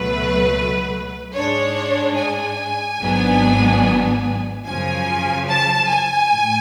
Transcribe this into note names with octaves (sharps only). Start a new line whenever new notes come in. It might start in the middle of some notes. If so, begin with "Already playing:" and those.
Already playing: C#2 B2 F#3 A3 B4
G#2 G#3 D4 C#5
G#5
G#1 G#2 F#3 B3 D4
F#2 C#3 F3 G#5
A5
G#5
A2